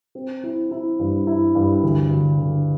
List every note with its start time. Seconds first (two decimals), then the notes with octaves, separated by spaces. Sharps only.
0.15 C4
0.43 E4
0.71 E4
0.99 G2
1.27 E4
1.55 G2
1.83 D2
2.11 D2
2.39 D3